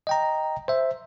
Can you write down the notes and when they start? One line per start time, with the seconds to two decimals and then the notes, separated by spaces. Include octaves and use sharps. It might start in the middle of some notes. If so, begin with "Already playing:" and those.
0.07 D#5 G5 A#5
0.68 C5 E5